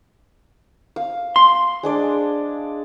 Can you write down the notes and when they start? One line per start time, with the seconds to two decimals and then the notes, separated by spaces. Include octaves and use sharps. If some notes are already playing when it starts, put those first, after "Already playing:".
0.96 F5
1.36 C6
1.83 G#3 D4 D5